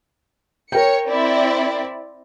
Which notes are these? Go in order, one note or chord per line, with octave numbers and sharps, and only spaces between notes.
A#4 C#5 G5 C#7
C4 E4 D5